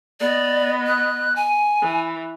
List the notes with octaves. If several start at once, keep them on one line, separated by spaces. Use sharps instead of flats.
B3 D5 D#5
F#6
G#5
E3